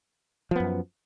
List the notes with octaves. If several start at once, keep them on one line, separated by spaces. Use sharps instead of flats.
F#2 F3 B3